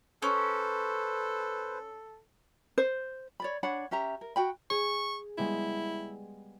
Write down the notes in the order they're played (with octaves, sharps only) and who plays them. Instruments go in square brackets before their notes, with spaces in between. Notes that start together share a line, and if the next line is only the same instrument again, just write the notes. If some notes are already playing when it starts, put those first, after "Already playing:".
[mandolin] C#4 [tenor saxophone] A4 [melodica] B4 C5
[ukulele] C5
C#5 D5 B5
D4 C#5 F#5 B5
C#4 G4 E5 A#5
A#4
F#4 G5 B5
[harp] G#4 [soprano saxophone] C#6
[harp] G3 G#3 B3 [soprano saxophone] E4